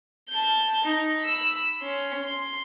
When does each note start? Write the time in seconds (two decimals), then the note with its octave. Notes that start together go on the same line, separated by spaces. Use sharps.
0.30 A5 G6
0.84 D#4
1.21 B5 E6
1.82 C#4 C6
2.22 C6